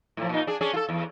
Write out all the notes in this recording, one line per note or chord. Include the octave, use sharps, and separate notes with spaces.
A2 F3
A#2 D#4
D4 G#4
C#4 D4 G#4
F4 A4
E2